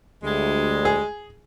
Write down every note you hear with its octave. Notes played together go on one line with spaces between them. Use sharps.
D2 G3 G#3
G#4